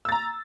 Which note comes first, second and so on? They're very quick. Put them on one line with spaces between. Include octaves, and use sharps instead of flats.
E6 A6 A#5